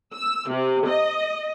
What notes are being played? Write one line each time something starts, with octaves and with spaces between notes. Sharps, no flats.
E6
C3
D#5